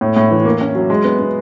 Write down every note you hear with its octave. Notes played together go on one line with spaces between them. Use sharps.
A2
A2
E3
A#3
C#4
F#3
G#3
B3
B3